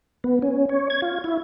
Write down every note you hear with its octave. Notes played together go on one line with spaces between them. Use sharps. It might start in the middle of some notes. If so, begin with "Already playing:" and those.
B3
C#4
C#5
G#6
F4
E4